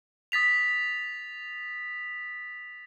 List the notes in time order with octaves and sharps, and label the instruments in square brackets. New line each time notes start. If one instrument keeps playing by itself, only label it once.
[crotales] D#6 A6 B6 F7